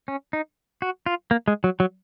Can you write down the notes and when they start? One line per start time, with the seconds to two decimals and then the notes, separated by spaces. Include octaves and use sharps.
0.08 C#4
0.33 D#4
0.82 F#4
1.06 F4
1.31 A#3
1.48 G#3
1.64 F#3
1.80 F#3